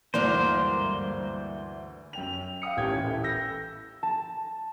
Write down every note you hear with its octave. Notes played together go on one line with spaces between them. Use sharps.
D2 G2 E3 G#3 A#3 D4 C5 A#5
F#2 G5 F7
F7
F5 G5 D#6 C#7
D#1 A1 C#4 G4 G5 G#6
E3 E4 A4
E6 G6 A#6
A5